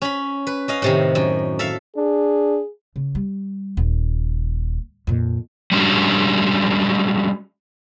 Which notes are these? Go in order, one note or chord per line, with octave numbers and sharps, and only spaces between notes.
C#4 B5
B4
C#4 D#5 F5
A2 C3 D#3
F#2
A4 E5 F5
D4 G#4
C#3
G3
D#1
F2 A#2
G3 G#3 C#4 D4 F#4 G4